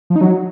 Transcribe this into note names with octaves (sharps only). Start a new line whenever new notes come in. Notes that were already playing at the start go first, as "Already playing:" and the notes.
F3
D#4
F#3